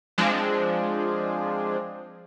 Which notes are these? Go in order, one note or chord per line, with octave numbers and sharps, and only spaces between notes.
F3 G#3 C4 D4